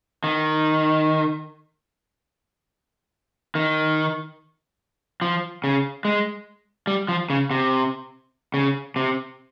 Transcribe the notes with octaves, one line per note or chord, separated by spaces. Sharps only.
D#3
D#3
F3
C#3
G#3
G3
F3
C#3
C3
C#3
C3